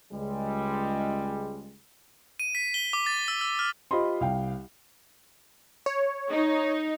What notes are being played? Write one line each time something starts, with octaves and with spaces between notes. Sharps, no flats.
C#2 G3 G#3
D#7
B6
G7
D6
A6
E6
E6
F6
F4 G4 C5 D#5 B5 C6
C2 F5 G5
C#5
D#4